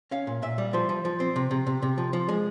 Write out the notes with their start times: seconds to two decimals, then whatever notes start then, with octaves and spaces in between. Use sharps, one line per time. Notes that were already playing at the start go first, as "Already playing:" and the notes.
0.11 C#4 F5
0.27 A#2
0.42 A#2 E5
0.58 G3
0.73 F3 C5
0.89 F3
1.05 F3
1.20 C4
1.36 C3
1.51 C3
1.67 C3
1.82 C3
1.98 F3
2.13 F3
2.29 G#3